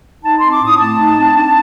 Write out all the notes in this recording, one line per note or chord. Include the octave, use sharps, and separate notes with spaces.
D#4 A5
C4 C6
D6
A2 D#6
A3 A5
D#4
C4
D4